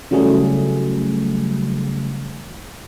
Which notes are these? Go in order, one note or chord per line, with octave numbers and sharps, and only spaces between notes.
C#3 E3 F#3 G3 A3 G#4